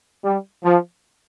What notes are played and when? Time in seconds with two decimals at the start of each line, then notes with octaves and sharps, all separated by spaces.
0.24 G3
0.65 F3